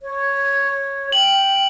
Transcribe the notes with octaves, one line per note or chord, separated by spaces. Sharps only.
C#5
G5 F#7